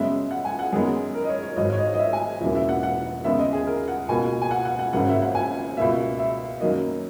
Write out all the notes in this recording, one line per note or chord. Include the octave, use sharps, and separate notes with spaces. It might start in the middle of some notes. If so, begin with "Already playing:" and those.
Already playing: F#2 C#3 G#3 B3 E5
F#5
G#5
F#5
F#2 D#3 G#3 B3 G#4
A#4
D#5
C#5
C#5
G#1 G#2 F#3 D#5
C#5
D#5
D#5
E5
G#5
E1 E2 C#3 F#3 A#3 E5
E5
F#5
F#5
D#2 C#3 G#3 B3 E5
D#5
G#4
A#4
F#5
C#2 B2 A#3 G#5
G#5
F#5
F#5
F#5
G#1 F#2 C#3 F#3 A#3 F#5
E5
F#5
G#5
C#2 B2 A#3 E5
E5
F#2 D#3 F#3 A#3 D#5